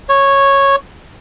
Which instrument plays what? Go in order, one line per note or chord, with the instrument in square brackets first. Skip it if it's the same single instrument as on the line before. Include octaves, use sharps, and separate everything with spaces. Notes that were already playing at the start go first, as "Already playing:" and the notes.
[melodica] C#5